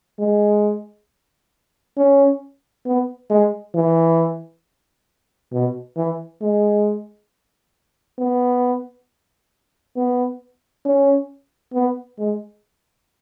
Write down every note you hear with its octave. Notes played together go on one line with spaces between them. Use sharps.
G#3
C#4
B3
G#3
E3
B2
E3
G#3
B3
B3
C#4
B3
G#3